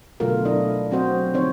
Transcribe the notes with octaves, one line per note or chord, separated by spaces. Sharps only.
B2 D3 F#3 A3 F4 A#4
A3 D4 E4 A#4 D#5
F#3 C4 F#4 C5 D#5
D3 F3 C4 D#4 C5 C#5